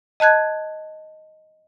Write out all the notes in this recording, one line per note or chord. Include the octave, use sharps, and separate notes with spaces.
D#5 A5 F#6 G#6